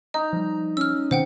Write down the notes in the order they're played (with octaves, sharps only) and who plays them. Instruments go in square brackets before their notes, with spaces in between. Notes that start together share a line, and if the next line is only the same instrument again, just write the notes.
[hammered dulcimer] D#4 [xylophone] D#5 [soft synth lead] A#5
[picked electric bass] F3 G3
[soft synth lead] C#4 [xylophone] E6 F6
[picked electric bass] B2 D#3 C4 [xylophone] C5 F#5 G5